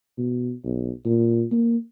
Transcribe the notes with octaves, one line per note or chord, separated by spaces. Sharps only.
B2
B1
A#2
A#3